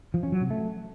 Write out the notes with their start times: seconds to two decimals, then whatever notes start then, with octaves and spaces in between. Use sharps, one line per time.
0.14 F3
0.23 C#4
0.32 F#3
0.41 C3
0.50 A3